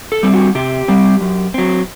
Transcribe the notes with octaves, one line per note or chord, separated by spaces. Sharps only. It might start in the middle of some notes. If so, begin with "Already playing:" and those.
A4
G3 C4
F#4
C3 G4
G3 C4
F#2
F#3 C4